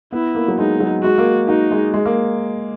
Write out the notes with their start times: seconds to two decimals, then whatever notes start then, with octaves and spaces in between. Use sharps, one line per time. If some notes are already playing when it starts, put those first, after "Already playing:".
0.12 B3 E4
0.35 A#3
0.48 F#3
0.57 G#3 D#4
0.80 F#3
1.03 G#3 F#4
1.18 A#3
1.48 D#4 F#4
1.71 G#3
1.94 G#3
2.05 A#3